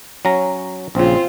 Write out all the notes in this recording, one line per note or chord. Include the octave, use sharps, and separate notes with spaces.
F#3 C#4 A#5
A#1 C#3 C4 F4